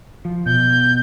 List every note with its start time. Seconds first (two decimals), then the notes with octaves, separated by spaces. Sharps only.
0.25 F3
0.46 B2 G6